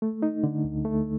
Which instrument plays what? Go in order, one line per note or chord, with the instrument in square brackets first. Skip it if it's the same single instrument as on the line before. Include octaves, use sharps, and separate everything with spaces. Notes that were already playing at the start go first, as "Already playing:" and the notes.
[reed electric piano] A3
D#4
D3
D2
A3